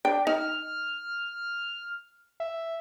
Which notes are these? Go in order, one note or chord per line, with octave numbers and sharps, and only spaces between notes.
D4 G5
D#4 F6
E5